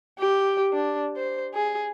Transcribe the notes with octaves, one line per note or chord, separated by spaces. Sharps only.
G4
D4
C5
G#4